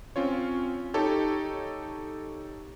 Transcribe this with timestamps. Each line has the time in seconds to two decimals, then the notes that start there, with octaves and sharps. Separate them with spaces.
0.16 C4 C#4 F4 C#5
0.94 D#4 G4 A4 C#5